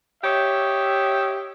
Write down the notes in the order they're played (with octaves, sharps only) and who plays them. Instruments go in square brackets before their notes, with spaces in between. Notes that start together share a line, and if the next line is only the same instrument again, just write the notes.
[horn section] G4 C#5 D#5 E5